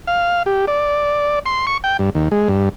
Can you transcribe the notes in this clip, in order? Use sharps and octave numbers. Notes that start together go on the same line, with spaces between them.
F5
G4
D5
C6
C#6
G5
G2
D#2
G#3
G2